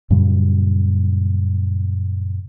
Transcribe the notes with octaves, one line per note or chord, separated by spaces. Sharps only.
F#2 A#2 C#3 G3